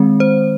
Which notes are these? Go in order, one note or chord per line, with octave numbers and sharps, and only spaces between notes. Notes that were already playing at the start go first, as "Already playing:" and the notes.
Already playing: D#3 G#3 C4
C5